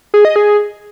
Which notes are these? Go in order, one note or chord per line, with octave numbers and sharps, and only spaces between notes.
G#4
D#5
G#4